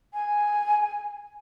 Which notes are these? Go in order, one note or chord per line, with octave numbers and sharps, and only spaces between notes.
G#5